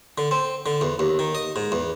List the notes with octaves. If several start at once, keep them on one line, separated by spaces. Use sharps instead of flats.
D3
C4
D3
E2
D#2
D#3
D#5
G#2
E2